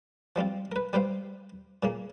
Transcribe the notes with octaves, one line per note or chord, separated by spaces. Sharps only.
F3 G3 C4 F4
A#4 B4
G3 B4 C5 F5
A#2 C#3 A#3